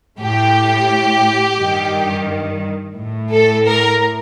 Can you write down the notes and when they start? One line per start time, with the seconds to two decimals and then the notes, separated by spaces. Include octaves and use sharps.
0.20 A2 G4
1.58 G2 D#3
2.96 A2
3.31 A4
3.66 A#4